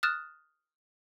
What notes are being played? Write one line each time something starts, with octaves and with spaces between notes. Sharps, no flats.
D#6 F6 F#6 A6 E7